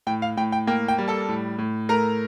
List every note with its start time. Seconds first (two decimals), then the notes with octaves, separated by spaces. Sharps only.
0.07 A2 G5
0.22 F5
0.37 A2 G5
0.52 G5
0.67 A#3 G5
0.88 G5
0.98 G3
1.08 A4 A5
1.28 A2
1.58 A2
1.89 A3 A#4 A#5